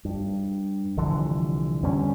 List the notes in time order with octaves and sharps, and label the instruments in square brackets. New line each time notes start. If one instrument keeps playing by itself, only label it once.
[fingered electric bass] G2
C2 D3 E3 F3
E2 D3 G3 C#4